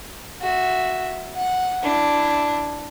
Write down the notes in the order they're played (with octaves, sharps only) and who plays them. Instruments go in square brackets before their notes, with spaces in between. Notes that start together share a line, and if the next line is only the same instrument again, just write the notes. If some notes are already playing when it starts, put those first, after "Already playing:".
[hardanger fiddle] F#4 E5
F#5
[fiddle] D4 [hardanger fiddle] E4